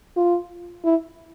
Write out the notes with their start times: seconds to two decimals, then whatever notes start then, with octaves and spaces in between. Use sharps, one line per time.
0.16 F4
0.85 E4